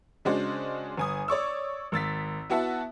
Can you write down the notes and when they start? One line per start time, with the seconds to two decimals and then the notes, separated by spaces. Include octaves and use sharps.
0.25 C#3 G#3 C#4 D4 F#4 C5
0.97 G1 G#5 D#6
1.28 C#5 D5 C#6 E6
1.92 G#1 E6 A6 B6
2.50 B3 E4 F#4 E5 F#5 A5